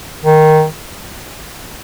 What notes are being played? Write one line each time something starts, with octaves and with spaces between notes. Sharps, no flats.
D#3